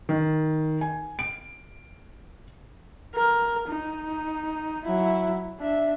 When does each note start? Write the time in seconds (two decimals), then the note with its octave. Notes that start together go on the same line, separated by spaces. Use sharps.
0.09 D#3
0.81 G#5
1.19 D7
3.15 A#4
3.69 D#4
4.85 F#3 E4
5.59 D4 E5